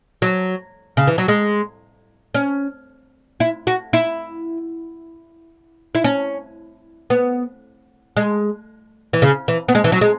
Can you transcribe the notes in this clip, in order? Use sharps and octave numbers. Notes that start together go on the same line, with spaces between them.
F#3
C#3
E3
F#3
G#3
C#4
E4
F#4
E4
E4
C#4
B3
G#3
E3
C#3
E3
B3
G#3
E3
F#3
G#3